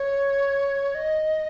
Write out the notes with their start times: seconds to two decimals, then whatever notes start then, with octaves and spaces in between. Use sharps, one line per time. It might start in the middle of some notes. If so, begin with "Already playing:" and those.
Already playing: C#5
0.95 D#5